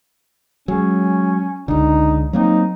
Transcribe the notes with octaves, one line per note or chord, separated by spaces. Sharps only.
F#3 G#3 C#4
C#2 D3 D#4
F#3 A#3 C4 D#4